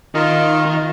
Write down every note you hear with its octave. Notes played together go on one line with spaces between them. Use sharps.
D#3 F4 A#4 D#5